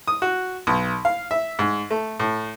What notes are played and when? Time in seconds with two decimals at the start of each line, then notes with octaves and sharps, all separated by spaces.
0.07 D#6
0.22 F#4
0.67 B1
1.05 F5
1.31 E5
1.59 G#2
1.91 A3
2.20 A2